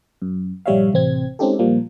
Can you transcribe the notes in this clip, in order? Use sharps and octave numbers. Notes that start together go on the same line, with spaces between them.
F#2
A#1 G2 G3 C#5 E5 F5
A1 C3 C4 G#6
G#3 C4 C#4 D#4 G4 A4
A#2 F3 G3 A#3